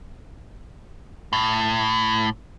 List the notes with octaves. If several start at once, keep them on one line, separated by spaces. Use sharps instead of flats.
A2